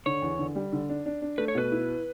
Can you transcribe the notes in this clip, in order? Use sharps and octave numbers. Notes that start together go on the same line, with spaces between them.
D3 C#5
E2
D3
G3
D3
D4
D4
D4
A3 B4
C#5
B2 B4
E4